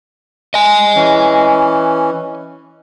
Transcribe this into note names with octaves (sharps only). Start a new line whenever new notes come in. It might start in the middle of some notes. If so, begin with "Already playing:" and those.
D#5 G#5
E3 C#4